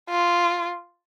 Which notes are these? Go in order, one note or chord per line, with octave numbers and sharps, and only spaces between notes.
F4